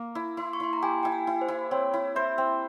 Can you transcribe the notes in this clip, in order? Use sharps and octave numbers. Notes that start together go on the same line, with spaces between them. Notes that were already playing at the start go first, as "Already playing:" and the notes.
Already playing: A#3
E4
E4 C6
C#6
E4 C6
A#5
G4 G#5
E4 G5
G#5
E4
C5
E4
C4 C#5
E4
C5 E5
C4